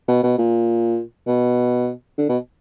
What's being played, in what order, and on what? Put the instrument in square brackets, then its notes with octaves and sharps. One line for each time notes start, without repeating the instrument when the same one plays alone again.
[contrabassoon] B2
B2
A#2
B2
D3
B2